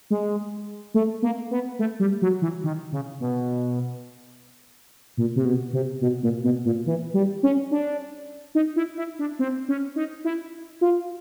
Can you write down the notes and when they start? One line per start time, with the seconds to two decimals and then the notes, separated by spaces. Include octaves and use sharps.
0.10 G#3
0.94 A3
1.22 A#3
1.51 B3
1.79 A3
2.00 G3
2.22 F#3
2.42 E3
2.64 D#3
2.92 C#3
3.20 B2
5.17 A#2
5.36 C3
5.45 B2
5.73 C3
6.01 B2
6.23 A#2
6.44 B2
6.65 A#2
6.86 E3
7.14 G3
7.43 C#4
7.71 D4
8.55 D#4
8.76 E4
8.97 E4
9.19 D4
9.39 C4
9.69 C#4
9.96 D#4
10.25 E4
10.81 F4